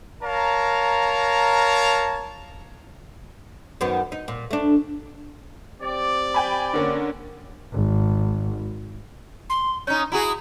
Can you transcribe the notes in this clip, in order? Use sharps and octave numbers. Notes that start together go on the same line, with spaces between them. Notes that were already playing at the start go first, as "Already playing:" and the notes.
A#4 C#5 F5 A5 A#5
F#2 D#3 B3
D#4
A#2
A3 D4
C4 G4 D5
G5 G#5 B5
D3 A#3 C#4
G#1
C6
C#4 D#4 G6
E4 F#4 G#4 A#5